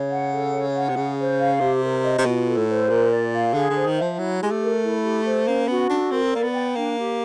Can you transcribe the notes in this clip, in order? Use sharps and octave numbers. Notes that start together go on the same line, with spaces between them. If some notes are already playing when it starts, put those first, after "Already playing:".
Already playing: C#3 C#5
F#5
A4
C#5
F#5
C3
C#3 G#4
C5
F5
C3 G4
A#4
D#5
C3
B2 F4
A4
A2
C5
A#2 A#4
D5
F5
D3 G#4
D3
C5
D#3
F3 E5
F#3 E4
G#3 G4
A3
A#4
E4
G4
C5
A#3 C#4
B3 F#4
D4 A4
C4 A#4
A#3 D5
B3
G5
A#3 D4
G4